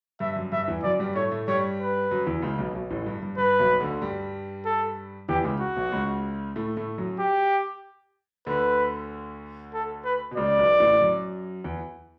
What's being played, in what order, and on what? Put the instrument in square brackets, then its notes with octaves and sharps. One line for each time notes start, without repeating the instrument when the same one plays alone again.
[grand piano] G2 [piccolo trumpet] E5
[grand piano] F#2
[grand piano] G2 [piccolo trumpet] E5
[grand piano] E2 E3
[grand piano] F#2 F#3 [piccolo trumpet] D5
[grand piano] G2 G3
[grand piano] A2 A3 [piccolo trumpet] C#5
[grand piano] A2 A3
[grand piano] G2 G3 [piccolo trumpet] C#5
[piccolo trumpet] B4
[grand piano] F#2 F#3
E2 E3
C#2 C#3
B1 B2
B1 B2
A1 A2
G2
G2
[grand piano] G2 [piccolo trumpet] B4
[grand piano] B1 B2
D2 D3
G2 G3
[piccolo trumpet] A4
[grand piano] E2 E3 [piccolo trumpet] G4
[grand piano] C#2 C#3
[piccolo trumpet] F#4
[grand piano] B1 B2
C#2 C#3
A2 A3
A2 A3
F#2 F#3
[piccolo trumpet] G4
[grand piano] D2 D3 [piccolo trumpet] B4
[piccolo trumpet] A4
B4
[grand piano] B2
[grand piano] C#2 C#3 [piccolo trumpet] D5
[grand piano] B1 B2
A1 A2
F#2 F#3
E2 E3